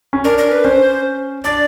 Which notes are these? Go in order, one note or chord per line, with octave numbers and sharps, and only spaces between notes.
C#4
D4 A#4
A#4
B4
C#4 C5
D4 D5